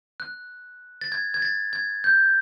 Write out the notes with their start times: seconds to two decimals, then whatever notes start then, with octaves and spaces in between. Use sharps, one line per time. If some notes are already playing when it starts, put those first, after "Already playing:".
0.20 F#6
1.01 A6
1.12 G#6
1.34 G#6
1.42 A6
1.73 G#6
2.04 G6